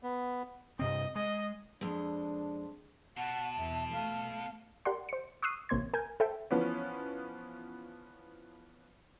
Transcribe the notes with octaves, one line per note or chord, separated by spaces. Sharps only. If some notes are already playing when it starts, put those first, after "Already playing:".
B3
G2 C3 C4 D#5
G#3 D#5
F2 G#3 D4
B2 F#5 A5
E2 E5
A3 F5
G4 A#4 D5 F#5 C6
C5 C#7
C#6 D#6 E6 F#6 C7 D#7
A1 C3 A#3 C#5 C6 G#6
A#4 G#5 G6
A4 C5 E5 G5
E3 F3 B3 C#4